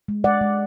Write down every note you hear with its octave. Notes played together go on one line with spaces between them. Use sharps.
G#3
G#3 D5 F#5
G#3